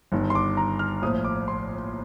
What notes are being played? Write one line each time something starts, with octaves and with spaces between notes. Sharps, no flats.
G1 G2 D#3
C6
D6
A#5
F6
A#1 A2 F3 D#6
D6
C6